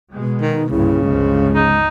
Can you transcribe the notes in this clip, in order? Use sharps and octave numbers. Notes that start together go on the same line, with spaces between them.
B2 G#3
D#3 D#4
C2 G2 A#2 C#3 E4
G1 C#2 F3 G#3
D#4